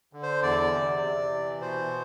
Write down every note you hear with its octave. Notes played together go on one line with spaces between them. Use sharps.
D3
C5
E2 D5
C3
C3
E3
B2 C5